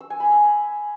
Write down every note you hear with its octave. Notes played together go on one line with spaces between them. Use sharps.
E6
G#5
B5
E6